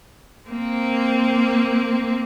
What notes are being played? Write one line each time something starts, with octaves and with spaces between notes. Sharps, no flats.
A#3 C4